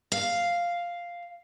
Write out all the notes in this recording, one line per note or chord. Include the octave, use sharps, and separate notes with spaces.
F5